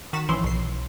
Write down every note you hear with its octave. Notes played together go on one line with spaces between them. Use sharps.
D#3 F#4 A6 B6 E7
A1 E3 F3 C#4 E4 C6
B1 C7